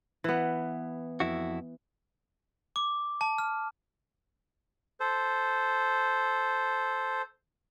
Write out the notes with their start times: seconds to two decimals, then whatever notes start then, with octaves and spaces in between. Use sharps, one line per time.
0.24 E3 B3
1.20 F2 E4 F#4
2.76 D6
3.21 A5
3.38 F6
5.00 A4 C5